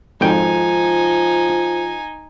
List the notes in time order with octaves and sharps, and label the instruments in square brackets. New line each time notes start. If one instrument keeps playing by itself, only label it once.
[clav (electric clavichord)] G#1 F2 G5 [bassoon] F3 [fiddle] D#4 G#5